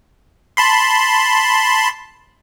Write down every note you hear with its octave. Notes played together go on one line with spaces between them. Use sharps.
A5 B5 C6